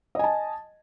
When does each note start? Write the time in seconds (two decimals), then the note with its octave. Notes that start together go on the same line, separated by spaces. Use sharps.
0.15 D#5
0.19 G#5
0.24 A5